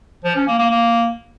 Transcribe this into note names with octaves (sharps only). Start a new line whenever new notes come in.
F3
C#4
A#3
A#3
A#3